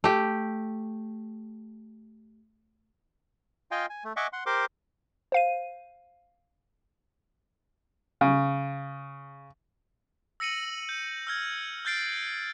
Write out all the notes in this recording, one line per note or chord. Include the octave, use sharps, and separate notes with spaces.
A3 G4
F4 D#5 F5 G5 G#5
G#5
A3
D#5 E5 F#5 G#5 C#6 D6
F#5 C6
G4 A#4 C5 C6 D6
C5 F5 D#7
C#3
E6 A#6 C#7 D#7 F#7
G6
E6 F6 G#6
F6 G6 A6 C7 D7